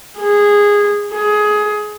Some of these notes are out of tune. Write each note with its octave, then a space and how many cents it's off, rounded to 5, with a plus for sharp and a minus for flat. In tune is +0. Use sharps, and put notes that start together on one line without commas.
G#4 -15
G#4 +20